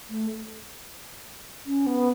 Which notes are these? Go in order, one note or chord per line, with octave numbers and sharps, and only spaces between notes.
A3
C#4
B3